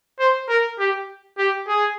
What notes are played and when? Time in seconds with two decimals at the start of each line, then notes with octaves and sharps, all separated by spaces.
0.20 C5
0.49 A#4
0.79 G4
1.38 G4
1.68 G#4